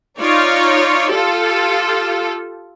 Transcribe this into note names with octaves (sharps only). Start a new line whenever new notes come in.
D#4 F4 C#5 D5
F4 G4 A4